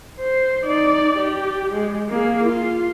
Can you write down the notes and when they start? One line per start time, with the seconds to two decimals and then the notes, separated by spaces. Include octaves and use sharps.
0.19 C5
0.65 D#4 D5
1.17 G4
1.73 G#3
2.09 A#3 G#4
2.44 F4